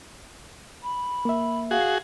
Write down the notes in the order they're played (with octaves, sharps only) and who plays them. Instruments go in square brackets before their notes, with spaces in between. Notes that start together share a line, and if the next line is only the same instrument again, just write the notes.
[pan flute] B5
[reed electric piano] A#3 E5
[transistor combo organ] F#4 G#4 [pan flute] F5